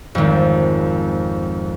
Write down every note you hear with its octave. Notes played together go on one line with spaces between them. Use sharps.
G#1 F2